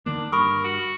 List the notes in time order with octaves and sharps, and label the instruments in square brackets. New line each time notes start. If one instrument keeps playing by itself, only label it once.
[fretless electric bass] D3 D#3 A#3 [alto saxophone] D4
[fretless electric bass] G2 [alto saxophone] A#4 [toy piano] B5 C#6 D#6
[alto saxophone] F#4